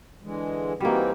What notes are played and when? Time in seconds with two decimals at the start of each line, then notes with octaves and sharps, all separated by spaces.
0.23 D3 E3 G#3
0.80 E3 G3 A#3 C4 D#4 F#4